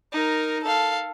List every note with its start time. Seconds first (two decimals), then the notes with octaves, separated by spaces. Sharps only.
0.12 D#4 A#4
0.64 A4 F5